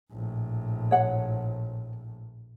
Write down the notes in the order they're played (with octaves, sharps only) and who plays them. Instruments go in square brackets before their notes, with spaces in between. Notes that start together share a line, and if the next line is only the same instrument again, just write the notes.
[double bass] A#1 A2
[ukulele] C#5 F#5